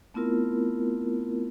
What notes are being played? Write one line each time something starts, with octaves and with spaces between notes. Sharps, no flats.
A3 B3 C4 E4 F4 A#4